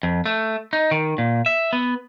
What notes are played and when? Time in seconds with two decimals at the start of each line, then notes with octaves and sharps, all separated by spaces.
0.03 F2
0.26 A3
0.73 D#4
0.91 D#3
1.18 A#2
1.46 E5
1.73 B3